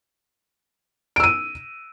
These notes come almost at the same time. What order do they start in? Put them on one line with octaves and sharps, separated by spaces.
D7 E6 D#7